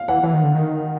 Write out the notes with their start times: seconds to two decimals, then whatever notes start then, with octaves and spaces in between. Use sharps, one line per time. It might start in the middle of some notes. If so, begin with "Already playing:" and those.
Already playing: F5
0.08 E3 F#5
0.23 E3 F#5
0.34 D#3
0.44 D3
0.55 D#3